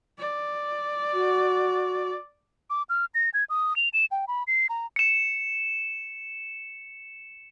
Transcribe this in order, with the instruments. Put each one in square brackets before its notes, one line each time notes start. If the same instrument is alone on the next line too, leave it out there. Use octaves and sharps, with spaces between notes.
[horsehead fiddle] D5
[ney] F#4
[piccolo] D6
F6
A#6
G#6
D#6
F7
E7
G5
B5
C7
A#5
[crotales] C#7 E7